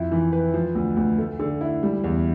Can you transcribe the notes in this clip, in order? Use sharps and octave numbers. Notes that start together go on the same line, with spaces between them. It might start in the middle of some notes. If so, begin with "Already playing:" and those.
Already playing: F2 E4
E3
B4
F3
D2
D2
A3
D3
E4
G3
E2